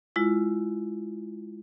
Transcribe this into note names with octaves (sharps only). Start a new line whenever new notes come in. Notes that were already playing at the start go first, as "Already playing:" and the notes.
G#3 E4 F4